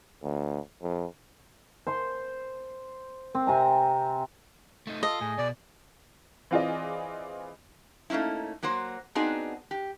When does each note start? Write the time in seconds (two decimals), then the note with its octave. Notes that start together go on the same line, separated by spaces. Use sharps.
0.23 D2
0.82 F2
1.87 C5 C6
3.35 C4
3.47 C3 G#5 A#5
4.87 A3 D#4
5.03 F4 A4 D#5
5.21 A2 G#4
5.38 B2 D5
6.51 E3 C4 F4 G#4 D5 D#5
8.10 A3 A#3 C#4 D#4 E4
8.63 F#3 A#3 F#4 C5
9.15 B3 C4 D4 D#4 F#4 G#4
9.71 G4